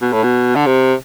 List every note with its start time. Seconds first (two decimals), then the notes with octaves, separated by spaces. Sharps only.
0.02 B2
0.13 A2
0.23 B2
0.56 D3
0.66 C3